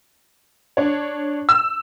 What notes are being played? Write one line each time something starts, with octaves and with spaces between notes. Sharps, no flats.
D4 C#5
E6